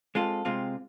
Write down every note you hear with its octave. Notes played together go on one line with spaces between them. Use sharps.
G#3 C4 F4 A4
C3 G#3 C4 F4